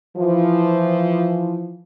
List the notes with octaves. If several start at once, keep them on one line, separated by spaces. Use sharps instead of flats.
E3 F3